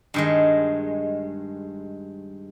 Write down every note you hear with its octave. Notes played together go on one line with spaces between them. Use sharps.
G2 D#3 G#3